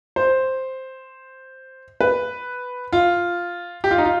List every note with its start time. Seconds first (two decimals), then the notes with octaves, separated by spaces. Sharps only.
0.16 C5
2.01 B4
2.93 F4
3.84 G4
3.91 F4
3.98 D#4
4.05 F4